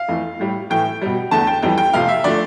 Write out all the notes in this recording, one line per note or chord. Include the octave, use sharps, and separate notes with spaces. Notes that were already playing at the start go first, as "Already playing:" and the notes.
Already playing: F5
F2 E3 A3
A2 G3
A2 E3 A3 G5
B2 G3
E2 D3 A3 A5
G5
F2 E3 G3 G5
G5
F2 C3 F3 A3 F5
E5
D3 F3 A3 D5